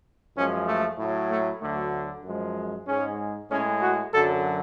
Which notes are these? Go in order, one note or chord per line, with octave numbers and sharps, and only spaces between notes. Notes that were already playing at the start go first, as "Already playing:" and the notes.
F#2 F3 G#3 C#4
A3
A2 F#3
A3
D2 D3 F#3 A3
F#2 F3 G#3
G#2 G#3 C#4
A2 G#3 C#4
F#4
F#2 D3 F#3 A4